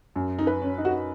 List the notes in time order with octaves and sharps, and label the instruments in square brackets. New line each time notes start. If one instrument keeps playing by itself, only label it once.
[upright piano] F#2
[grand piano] D#4
[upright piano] B4
[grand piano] C#4
[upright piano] D#4
[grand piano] F#4